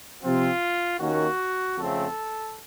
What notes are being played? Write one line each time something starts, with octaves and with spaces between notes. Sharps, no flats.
C3 F3 C4 F4
D#2 D#3 A#3 C#4 F#4
F2 C#3 A3 C4 A4